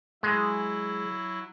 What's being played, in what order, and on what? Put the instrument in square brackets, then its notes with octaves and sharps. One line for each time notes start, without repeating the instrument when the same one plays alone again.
[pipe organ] F#3 E4 [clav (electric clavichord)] G#3